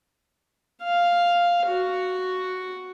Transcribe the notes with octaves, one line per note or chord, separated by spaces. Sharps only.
F5
F#4